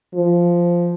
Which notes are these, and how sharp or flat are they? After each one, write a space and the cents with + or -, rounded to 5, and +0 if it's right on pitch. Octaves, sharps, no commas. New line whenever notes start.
F3 -5